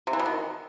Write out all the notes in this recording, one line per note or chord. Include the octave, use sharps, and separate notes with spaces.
C3
E3
B2
D#3